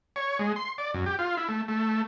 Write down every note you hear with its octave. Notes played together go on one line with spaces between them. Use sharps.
C#5
G#3
C6
D5
F#2
G4
F4
E4
A3
A3